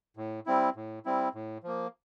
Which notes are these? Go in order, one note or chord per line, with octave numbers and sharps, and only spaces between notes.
A2
G3 C4 E4
A2
G3 C4 E4
A2
F3 A#3